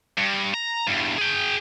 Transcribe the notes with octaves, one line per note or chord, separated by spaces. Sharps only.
G2
A#5
E2 G2
G#4 G5